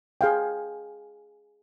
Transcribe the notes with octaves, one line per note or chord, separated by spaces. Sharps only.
G#4 F5 G5